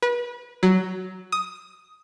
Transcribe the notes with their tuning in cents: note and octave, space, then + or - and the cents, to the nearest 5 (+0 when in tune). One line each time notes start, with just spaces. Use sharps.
B4 -30
F#3 +10
D#6 +10